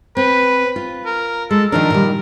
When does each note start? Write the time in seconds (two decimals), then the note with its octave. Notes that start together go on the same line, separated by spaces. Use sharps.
0.17 C4 B4
0.76 F4
1.06 A#4
1.51 G#3 A4
1.72 D#3 F3 D4 A#4
1.90 A#2 D#3 G3